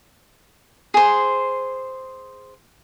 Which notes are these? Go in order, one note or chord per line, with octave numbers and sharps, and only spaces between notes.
G#4 C5